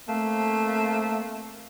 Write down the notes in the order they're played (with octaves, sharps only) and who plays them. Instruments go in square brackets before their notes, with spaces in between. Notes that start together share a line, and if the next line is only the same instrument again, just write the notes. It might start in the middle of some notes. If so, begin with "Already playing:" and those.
[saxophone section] A3 A#3 C4